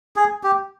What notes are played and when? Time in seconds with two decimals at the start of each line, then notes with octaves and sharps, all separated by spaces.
0.16 G#4
0.43 G4